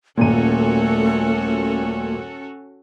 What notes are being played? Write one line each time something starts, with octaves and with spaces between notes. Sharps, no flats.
D#1 A#2 A3 A#3 C#4 F#4 A4 D#7